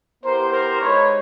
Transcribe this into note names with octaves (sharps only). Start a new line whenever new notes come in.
B3 E4 G4 A#4 C5
A#4 C5
G#3 B3 D#4 B4 C#5